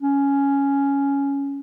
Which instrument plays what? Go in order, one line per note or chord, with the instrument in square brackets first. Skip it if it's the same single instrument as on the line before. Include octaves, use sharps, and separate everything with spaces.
[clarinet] C#4